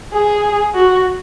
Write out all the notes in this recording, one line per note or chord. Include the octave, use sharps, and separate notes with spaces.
G#4
F#4